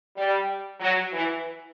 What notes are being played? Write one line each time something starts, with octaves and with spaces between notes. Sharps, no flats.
G3
F#3
E3